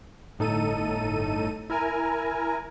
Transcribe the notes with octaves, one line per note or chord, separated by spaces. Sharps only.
G1 A2 D#4 A4 D#7
E4 A#4 G#5 A#5